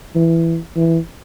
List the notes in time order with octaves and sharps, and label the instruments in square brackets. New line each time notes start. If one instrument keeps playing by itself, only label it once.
[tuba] E3
E3